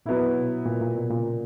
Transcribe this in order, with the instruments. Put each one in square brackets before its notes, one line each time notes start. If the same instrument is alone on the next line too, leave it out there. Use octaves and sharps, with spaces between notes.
[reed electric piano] A#2 [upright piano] F#3 B3 E4
[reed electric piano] B2
A#2
A#2
B2
A#2 C#3